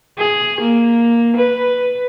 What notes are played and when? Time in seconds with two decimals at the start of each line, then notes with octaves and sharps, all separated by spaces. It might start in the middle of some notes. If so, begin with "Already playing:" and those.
0.18 G#4
0.60 A#3
1.37 B4